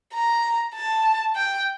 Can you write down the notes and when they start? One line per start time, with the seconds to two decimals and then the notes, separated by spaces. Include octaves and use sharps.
0.14 A#5
0.75 A5
1.36 G5